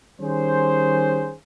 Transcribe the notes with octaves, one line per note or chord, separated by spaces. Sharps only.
D#3 G3 C#4 G#4 C5